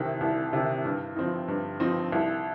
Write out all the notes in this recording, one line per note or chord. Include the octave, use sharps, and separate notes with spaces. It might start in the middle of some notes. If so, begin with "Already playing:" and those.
Already playing: C2 C3 D#3
C2
C3 D#3
G2
F3 C4 D#4
G2
F3 C4 D#4
C2